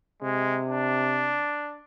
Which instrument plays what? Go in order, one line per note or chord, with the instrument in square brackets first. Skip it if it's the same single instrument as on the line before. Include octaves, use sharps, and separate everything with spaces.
[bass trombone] C3 [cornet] G#3
[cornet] D4